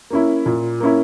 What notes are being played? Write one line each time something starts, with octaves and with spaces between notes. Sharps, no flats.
A#3 C#4 E4
A#2
A#3 C#4 E4